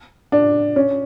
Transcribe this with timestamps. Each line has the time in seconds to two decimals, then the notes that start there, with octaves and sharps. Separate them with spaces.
0.32 D4
0.76 C#4